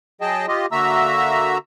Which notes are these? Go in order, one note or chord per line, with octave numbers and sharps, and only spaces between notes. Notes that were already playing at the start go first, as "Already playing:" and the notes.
F#3 G#4 D#5 G5 A5
F4 G4 D#5
D3 A#3 F#4 E5 A#5 E6